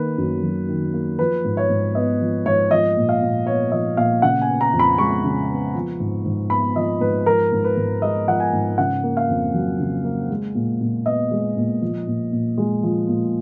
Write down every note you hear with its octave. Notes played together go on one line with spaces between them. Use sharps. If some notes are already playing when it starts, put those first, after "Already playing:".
Already playing: D#3 A#3 B4
F#2
F#3
D#3
A#3
F3 B4
G#2
C#5
G#2
B3 D#5
F3
G#2 C#5
F3 D#5
A#2
F5
A#2
B3 C#5
F3 D#5
A#2 F5
C#3 F#5
G#5
B3
A#5
F2
B5
G#3 C#6
C#3
B3
F3
G#2
G#2
B3 B5
F3 D#5
G#2 B4
F3 A#4
G#2
B4
G#2
G#3 D#5
F3 F#5
G#5
G#2
C#3 F#5
A#3
F5
F2
F#3
C#3
A#3
G#3
A#2
A#2
B3 D#5
G#3
A#2
F3
A#2
A#2
G#3
F3
A#2